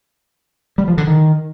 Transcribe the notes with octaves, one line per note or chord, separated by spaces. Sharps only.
G3
F3
D3
D#3